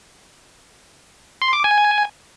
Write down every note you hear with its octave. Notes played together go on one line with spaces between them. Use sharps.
C6
D6
G#5